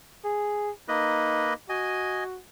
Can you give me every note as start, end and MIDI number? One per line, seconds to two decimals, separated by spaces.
0.25 0.70 68
0.88 1.54 58
0.88 1.54 63
0.88 1.54 71
0.88 1.54 75
1.69 2.39 66
1.69 2.24 75
1.69 2.24 80